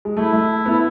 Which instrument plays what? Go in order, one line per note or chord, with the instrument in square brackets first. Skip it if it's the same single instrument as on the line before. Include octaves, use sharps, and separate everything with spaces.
[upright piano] G#3
[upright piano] A3 [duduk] E4
[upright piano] A3
[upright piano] B3 [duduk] E4